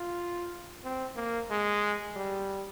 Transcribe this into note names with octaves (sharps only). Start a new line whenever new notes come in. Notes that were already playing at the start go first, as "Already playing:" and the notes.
Already playing: F4
C4
A#3
G#3
G3